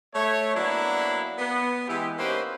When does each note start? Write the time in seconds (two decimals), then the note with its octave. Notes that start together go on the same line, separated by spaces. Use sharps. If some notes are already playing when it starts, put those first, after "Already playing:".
0.14 A3 C#5
0.55 F#3 A#3 B3 D4 E4
1.39 B3
1.88 E3 G#3 B3 E4 G4
2.19 A#3 C#4 D#4 G4 B4 C5